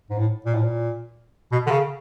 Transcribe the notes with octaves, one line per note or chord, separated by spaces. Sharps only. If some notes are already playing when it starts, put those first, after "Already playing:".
G#2
A2
A#2
A2
A#2
B2
D3
C#3